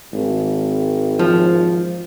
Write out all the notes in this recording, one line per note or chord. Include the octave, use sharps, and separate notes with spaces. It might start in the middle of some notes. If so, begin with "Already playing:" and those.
G#1
F3